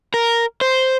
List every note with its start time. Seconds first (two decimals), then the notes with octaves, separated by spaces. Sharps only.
0.14 A#4
0.61 C5